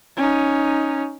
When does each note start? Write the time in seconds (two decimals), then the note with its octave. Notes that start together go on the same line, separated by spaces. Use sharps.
0.17 C#4 D#4